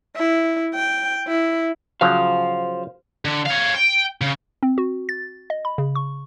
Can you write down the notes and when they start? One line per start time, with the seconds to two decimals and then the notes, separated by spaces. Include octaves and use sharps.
0.16 E4
0.75 G5
1.27 E4
2.01 C#3 F3 F#3 C5 F5
3.25 D3
3.46 C#5 F5
3.75 G5
4.21 C#3
4.63 C4
4.78 F#4
5.09 A6
5.50 D#5
5.65 B5
5.78 C#3
5.95 C#6